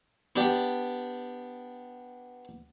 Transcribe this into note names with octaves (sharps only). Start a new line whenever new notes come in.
B3 D4 G4